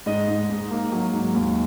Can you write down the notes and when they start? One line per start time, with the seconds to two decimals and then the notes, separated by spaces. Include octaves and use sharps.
0.06 G#2 D#5
0.28 G#2
0.50 G#2
0.71 A#3
0.92 F#3
1.13 G#2
1.34 D#2